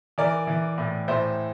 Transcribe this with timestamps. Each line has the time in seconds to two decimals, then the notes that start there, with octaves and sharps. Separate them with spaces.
0.18 E3 A#4 D5
0.47 E3
0.78 A2
1.08 A2 C5 E5